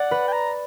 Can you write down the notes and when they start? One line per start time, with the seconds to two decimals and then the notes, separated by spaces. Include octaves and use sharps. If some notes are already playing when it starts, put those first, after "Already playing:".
Already playing: D5 F#5
0.11 B4
0.28 G5
0.33 A#5